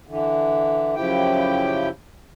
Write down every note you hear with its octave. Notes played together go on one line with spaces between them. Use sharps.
D3 E3
F#2 C#3 F3 E4 G4 G5